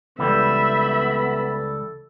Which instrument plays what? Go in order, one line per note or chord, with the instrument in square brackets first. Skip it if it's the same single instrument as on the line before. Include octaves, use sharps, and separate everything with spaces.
[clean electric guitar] C#2 E3 G3 [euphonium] B3 [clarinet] A4 [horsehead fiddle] E5 B5